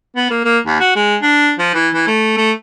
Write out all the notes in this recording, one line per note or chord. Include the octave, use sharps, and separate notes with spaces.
B3
A#3
A#3
D#2
F#4
G#3
D4
F3
E3
E3
A3
A3